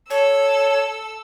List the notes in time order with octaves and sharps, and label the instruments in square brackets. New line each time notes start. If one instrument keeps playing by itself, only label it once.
[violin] A4 E6 [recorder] C#5